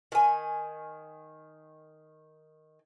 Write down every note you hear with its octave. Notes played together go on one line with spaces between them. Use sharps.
D#3 G#5